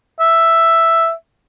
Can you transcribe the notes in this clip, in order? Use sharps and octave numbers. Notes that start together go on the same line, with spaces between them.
E5